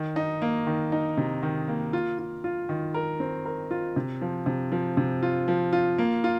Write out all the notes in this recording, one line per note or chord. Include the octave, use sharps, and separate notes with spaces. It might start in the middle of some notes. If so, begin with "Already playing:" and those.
Already playing: D#3
D#4
A#3
D#3
D#4
C3
D#3
A#3
F4
F4
F4
D#3
A#4
C4
A#4
F4
C3
F3
C3
F3
C3
F4
F3
F4
A#3
F4